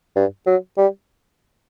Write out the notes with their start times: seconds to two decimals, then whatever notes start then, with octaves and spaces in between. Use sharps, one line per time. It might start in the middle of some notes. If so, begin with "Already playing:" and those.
0.16 G2
0.46 F#3
0.78 G3